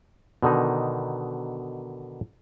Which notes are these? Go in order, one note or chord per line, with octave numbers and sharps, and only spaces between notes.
B2 D3 D#3 D#4